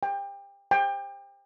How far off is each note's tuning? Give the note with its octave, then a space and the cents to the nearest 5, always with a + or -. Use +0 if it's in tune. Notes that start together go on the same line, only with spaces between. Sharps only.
G5 +30
G5 +30